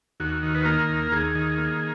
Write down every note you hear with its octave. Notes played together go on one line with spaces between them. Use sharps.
D#2 F#4
D#3
B4
A#3 A#4
D#2
D#2 G#4
D#3
A#3